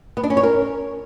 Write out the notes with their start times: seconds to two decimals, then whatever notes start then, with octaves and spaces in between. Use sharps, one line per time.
0.17 B3
0.23 D4
0.30 C#4
0.37 C#5
0.43 A#4